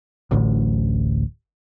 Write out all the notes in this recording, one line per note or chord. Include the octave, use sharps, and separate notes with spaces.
D1 A1 D2 A2